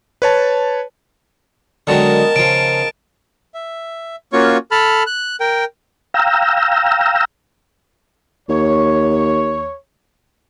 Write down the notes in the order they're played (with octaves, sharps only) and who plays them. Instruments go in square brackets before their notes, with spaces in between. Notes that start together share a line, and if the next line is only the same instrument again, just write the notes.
[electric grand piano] B4 C#5 A5
[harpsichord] D3 F#3 G#3 [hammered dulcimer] D#3 B3 [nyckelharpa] A#4 A5
[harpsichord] C#3 F3 [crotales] D7
[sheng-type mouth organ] E5
A#3 C#4 F4 F#4 C#5 C#6
A4 A5 B5 F6
F#6
A#4 G5
[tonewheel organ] F5 G5 A#5 E6
[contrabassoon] D#2 [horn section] C#5